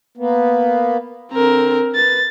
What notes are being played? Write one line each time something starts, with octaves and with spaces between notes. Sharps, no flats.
A#3 B3
D3 C4 A#4
B4 A6